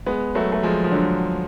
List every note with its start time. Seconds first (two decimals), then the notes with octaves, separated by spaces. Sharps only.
0.06 G#3 B3
0.35 F#3 A3
0.52 A3
0.63 F3 G#3
0.84 F3
0.91 D3 F#3